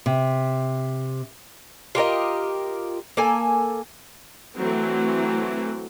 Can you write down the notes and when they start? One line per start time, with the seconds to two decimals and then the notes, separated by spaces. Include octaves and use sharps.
0.06 C3
1.95 F4 G4 A#4 D#5
3.17 A#3 A4 G#5
4.57 E3 F#3 A3 C4